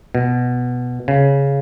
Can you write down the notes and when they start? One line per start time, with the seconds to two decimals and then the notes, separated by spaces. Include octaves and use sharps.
0.15 B2
1.08 C#3